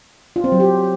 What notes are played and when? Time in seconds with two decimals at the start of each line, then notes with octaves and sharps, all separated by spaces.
0.36 F4
0.44 C4
0.52 F#3
0.60 G4